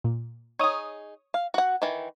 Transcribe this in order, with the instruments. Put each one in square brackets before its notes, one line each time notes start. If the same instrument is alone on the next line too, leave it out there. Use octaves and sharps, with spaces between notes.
[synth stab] A#2
[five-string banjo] D#4 G#4 [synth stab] C#5 D#6
[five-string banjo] F5
F#4 F#5
D#3 E3